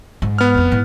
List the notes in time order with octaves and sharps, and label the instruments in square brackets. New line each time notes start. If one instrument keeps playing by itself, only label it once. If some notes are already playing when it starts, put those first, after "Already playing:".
[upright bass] G#2
[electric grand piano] B3 F6
[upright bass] F1 F2
G#2 E3